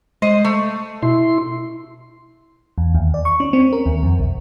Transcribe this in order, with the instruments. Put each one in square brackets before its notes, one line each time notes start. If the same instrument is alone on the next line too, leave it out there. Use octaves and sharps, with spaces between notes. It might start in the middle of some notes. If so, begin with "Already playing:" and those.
[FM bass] G#3 [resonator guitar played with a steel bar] C5 D#5
[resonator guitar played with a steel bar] A3
[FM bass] B2 [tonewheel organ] E4 C6
[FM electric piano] E2
D#2
D5
C#6
C#4
C4
A#4
D#2
F2
B1